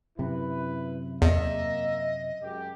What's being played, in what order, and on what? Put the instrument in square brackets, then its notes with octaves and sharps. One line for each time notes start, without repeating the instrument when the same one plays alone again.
[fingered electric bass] F#2 C3 [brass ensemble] E4 B4
[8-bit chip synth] E2 [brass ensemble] A#3 E5 [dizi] D#5
[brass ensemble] F#2 G#3 G4